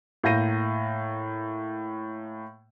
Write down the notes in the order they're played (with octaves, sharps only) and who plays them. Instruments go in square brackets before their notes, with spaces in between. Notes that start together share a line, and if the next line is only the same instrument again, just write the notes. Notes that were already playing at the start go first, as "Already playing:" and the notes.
[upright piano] A2 A#3 F5 G6 A#6 D#7